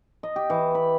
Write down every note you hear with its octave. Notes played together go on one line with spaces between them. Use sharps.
D#5
G4
E3
B5